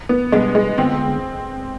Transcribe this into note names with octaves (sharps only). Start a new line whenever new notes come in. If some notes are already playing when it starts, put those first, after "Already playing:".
B3
B2 G3 G#3 D4
G#3
D3 G#3 B3 C4 F4